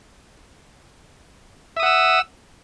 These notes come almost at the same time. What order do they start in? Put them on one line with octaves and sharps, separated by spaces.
E5 D#6 F#5 E6